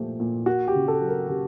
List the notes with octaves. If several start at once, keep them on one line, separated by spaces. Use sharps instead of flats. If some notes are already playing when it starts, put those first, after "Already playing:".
Already playing: A#2 F3 A3 G4
A#2
A#3 F#4
G4
C#3
A4
F#3
A#4
C#3 G4